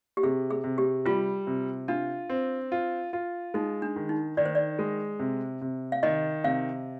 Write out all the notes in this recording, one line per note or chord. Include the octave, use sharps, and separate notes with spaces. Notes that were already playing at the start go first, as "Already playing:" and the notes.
G4
C3 G#4
G#4
C3
G4
G3 F4
C3
D4 F4
C4
F4
F4
G#3 D#4
D4
D#3
D#4
D#3 D5
C5
D5
G#3
C3
C3
F5
D#3 D#5
C3 F5